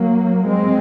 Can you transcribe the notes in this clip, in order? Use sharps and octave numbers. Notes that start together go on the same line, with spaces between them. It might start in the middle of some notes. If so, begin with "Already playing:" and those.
Already playing: F#3 A#3
G#3 C4